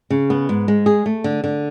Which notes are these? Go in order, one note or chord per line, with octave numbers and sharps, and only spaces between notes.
C#3
B3
G#2
G#3
G#4
A3
D3
D3